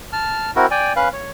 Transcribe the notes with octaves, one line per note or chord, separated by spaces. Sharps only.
A5 F6
C4 E4 F#4 A#4
D5 G5 G#5
C#4 B4 F5 F#6
C#5